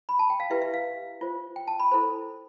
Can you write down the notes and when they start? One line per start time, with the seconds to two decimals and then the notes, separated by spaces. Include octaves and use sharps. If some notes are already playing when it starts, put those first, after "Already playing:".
0.09 B5
0.19 A5
0.30 G5
0.40 F5
0.50 E4 G4 B4 E5
0.62 E5
0.74 F5
1.21 F4 C5
1.56 G5
1.68 A5
1.80 B5
1.92 E4 A4 C5